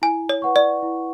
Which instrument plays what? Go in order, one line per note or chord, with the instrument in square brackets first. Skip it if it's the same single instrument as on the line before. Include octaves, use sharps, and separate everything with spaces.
[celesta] E4 [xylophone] G#5
[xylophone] C#5
[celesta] B4 F#5 C#6
[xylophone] D5
[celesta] E4